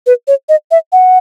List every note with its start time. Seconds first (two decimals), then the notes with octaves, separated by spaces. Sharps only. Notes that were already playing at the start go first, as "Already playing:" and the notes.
0.06 B4
0.28 C#5
0.49 D#5
0.71 E5
0.92 F#5